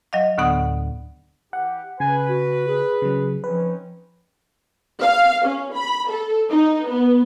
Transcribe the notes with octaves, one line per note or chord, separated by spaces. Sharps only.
F#3 D#5 F5
D2 A2 D3 B3 F#5 D#6
E3 G4 F#5
C#3 B4 G#5
F#4
G#4
C#3 F#3
F3 C4 C#4 D#4 B4
F5
C#4
B5
A4
D#4
B3